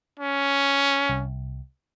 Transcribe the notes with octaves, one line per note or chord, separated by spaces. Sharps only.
C#4
C2